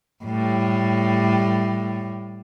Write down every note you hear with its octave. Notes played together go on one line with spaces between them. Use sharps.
A2 G3